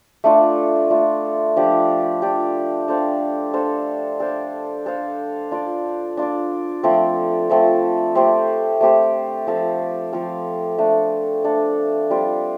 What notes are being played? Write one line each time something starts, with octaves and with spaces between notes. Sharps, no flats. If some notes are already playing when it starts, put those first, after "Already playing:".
A3 D4 F4
A3 D4 F4
F3 D4 G4
F3 D4 G4
D4 A4 C5 F5
D4 A4 C5 F5
D4 A4 C5 F5
D4 A4 C5 F5
D4 F4 D5
D4 F4 D5
F3 A3 C4 A4
F3 A3 C4 A4
A3 C4 G4 C5
A3 C4 G4 C5
F3 C4 A4 F5
F3 C4 A4 F5
A3 D4 A4
A3 D4 A4
G3 C4 F4